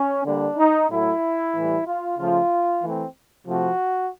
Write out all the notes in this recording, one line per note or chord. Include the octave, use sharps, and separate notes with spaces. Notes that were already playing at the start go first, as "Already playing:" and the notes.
Already playing: C#4
D3 G3 A#3 D4
D#4
A2 F#3 A3 E4
A2 E3 G3
F4
C#3 F3 A3 F4
E3 A3 C4
C3 F3 A3 F#4